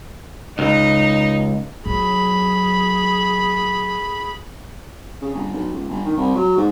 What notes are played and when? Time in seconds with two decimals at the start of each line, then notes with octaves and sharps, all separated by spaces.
0.59 C#2 D#4
1.86 F#3 G#4 B5
5.22 C#3
5.35 G1
5.54 B1
5.73 C#2
5.89 G1
6.05 D#3
6.17 C2
6.35 F#3
6.57 G#2